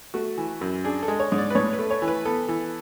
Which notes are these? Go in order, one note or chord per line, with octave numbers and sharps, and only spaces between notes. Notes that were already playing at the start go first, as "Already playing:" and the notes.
A3 F#4
E3
F#2
D4 G#4
A4
G#3
C#5
G#2
D5
B4
A2 C#5
B4
A3
C#5
E3
B4
B3 A4
E3